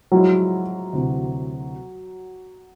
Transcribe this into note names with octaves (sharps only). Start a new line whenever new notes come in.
A2 F3 F#3 G#3 C#4 E4
D2 C3 E3